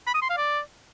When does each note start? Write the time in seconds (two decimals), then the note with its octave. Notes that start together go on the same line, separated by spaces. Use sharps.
0.07 B5
0.14 D#6
0.22 C6
0.29 F5
0.37 D5